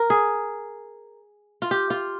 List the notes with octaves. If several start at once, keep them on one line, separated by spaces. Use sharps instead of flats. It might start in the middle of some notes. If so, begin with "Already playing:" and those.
Already playing: A#4
G#4
F4
G4
F4